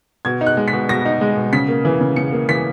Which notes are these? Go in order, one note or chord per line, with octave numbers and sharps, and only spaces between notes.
B2 G#6
D#4
F#6
G#3
B6
B2
B2 A#6
D#4
G#3
B2
C#3 B6
A#3
E3
C#3
C#3 C#7
A#3
E3 B6